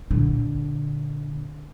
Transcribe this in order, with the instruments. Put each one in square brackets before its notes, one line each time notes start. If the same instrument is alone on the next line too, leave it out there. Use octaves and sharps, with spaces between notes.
[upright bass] A#2 D3